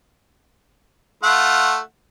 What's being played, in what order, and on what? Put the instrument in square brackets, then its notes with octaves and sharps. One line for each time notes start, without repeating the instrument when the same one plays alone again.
[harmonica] A3 F4 F#5